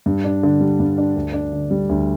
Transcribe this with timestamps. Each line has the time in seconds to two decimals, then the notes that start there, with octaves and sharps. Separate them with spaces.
0.06 G2
0.24 D4
0.43 D3
0.61 G3
0.80 G2
0.98 D4
1.16 D2
1.33 D4
1.52 D3
1.71 G3
1.89 D2